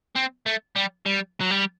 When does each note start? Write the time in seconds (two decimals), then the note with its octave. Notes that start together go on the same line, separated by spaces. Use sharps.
0.16 C4
0.46 A3
0.76 G3
1.06 G3
1.40 F#3
1.51 G3